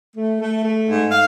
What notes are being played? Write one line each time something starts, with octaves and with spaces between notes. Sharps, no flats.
A3
A3
A3
G#2
F5